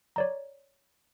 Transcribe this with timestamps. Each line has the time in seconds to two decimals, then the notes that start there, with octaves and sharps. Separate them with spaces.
0.16 C#5 D5 A#5